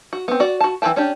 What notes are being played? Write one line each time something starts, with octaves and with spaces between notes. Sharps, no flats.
F#4
B3 C4
F#4 D5
F#4 A5
E3 F4 B4 G5 A5
C#4 D4 G4